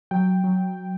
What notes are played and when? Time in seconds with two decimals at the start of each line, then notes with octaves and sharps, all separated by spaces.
0.11 F#3 G5
0.44 F#3